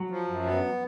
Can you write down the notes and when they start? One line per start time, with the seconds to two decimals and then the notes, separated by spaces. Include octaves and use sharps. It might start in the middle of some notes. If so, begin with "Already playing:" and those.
Already playing: F#3
0.10 F3
0.28 F#2
0.45 B3